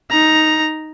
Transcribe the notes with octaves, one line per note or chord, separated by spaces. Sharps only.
D#4 A#5